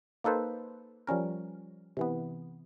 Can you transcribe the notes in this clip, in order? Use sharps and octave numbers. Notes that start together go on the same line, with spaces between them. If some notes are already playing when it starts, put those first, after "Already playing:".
A#3 D#4 A4 B4 C5
F3 G3 C#4 A#4
C3 E3 B3